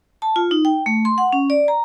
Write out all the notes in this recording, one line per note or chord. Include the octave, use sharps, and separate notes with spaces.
A5
F4
D#4
G5
A3
C6
F#5
C#4
D5
A#5